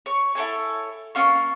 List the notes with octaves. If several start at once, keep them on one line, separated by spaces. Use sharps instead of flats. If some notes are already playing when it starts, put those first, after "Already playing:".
C#5 C#6
E4 A4 C#5 G#5
A#3 C#4 F4 C#6